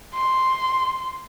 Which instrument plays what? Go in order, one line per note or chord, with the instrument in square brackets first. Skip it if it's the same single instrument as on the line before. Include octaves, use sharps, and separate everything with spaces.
[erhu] C6